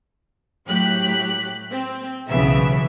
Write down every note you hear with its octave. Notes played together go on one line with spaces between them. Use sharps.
A2 F#3 G4 F#6 B6
C4
B1 C#3 E3 F#3 B3 E5